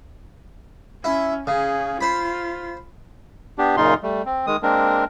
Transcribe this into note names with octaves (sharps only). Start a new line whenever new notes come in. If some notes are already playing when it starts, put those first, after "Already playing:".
C#4 E4
C#3 C#4 G#4
F4 C5 B5
B3 D4 G4
F#2 A#2 C#3 D#4 F4 C6
G3 A3
C4
D#3 G#3 D#6
G#3 A#3 C4 D4 A#4